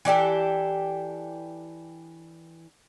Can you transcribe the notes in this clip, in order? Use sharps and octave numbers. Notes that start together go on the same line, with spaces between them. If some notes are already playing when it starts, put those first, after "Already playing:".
E3 D4 G4 A4